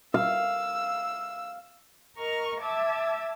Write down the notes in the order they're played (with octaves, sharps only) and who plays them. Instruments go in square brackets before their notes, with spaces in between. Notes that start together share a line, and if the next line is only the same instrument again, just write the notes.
[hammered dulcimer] F5 [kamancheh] E6
[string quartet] A#4 D#5 A#5 C#6 F6
E5 A5 D6 E6 G#6